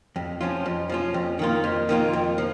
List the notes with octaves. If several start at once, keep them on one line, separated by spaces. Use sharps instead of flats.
F2
F3 C#4 F4
F2
F3 C#4 F4
F2
D#3 A#3 F4
F2
D#3 A#3 F4
F2
F3